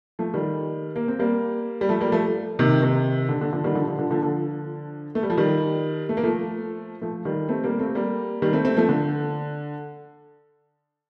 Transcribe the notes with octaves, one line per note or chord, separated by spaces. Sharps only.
F3 A3
D#3 G3
A#3
C4
G3 A#3
G3
F3 A3
G3 A#3
F3 A3
C3 D#3
C3 D#3
D3
D3
D3 F3
D#3 G3
D3 F3
D3 F3
D3 F3
D3 F3
D3 F3
A3
G3
F3
D#3 G3
A3
A#3
F3 A3
F3 A3
D#3 G3
A3 C4
G3 A#3
A3 C4
G3 A#3
D#3 G3
A3 C4
A3 C4
F3 A3
D3